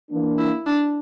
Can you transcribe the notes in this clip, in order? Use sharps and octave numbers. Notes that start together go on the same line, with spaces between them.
E3 A#3 D4
E4
D4